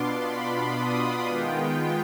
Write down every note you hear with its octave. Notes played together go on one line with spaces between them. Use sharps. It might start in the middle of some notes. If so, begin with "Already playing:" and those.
Already playing: B2 B3 D4 F4 C6 D6
B5
D#6
D#3 G#3 B3 F4 G5